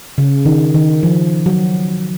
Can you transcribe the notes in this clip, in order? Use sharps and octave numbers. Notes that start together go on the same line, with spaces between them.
C#3
D#3
D#3
F3
F#3